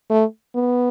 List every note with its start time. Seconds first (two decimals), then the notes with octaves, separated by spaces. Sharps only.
0.10 A3
0.55 B3